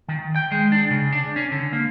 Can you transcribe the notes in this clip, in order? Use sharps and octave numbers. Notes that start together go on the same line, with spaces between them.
D#3
G5
G#3
D4
C#3
D4
C#4
D3
A#3